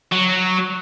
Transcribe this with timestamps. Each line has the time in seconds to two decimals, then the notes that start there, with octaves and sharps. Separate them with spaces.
0.12 F#3